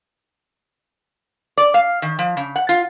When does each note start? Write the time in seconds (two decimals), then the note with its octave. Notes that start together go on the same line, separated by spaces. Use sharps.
1.58 D5
1.74 F5
2.02 D#3
2.19 F3
2.37 C#3
2.56 F#5
2.69 F4